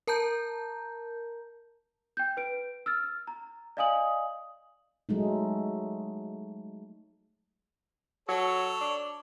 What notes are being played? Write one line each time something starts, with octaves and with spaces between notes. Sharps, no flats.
A#4 A5 A#5 G6
G5 G6
B4 D7
E6 F6 A6
A#5
D5 D#5 F5 G#5 D#6 F#7
F#3 G#3 A3 D#4
F#3 A4 C#5
D4